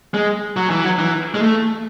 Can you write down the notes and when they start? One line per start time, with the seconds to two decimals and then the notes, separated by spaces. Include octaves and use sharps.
0.14 G#3
0.57 F#3
0.70 E3
0.84 F#3
0.99 E3
1.34 G#3
1.41 A3